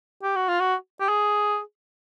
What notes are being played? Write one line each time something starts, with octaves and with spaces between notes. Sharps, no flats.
G4
F#4
F4
F#4
G4
G#4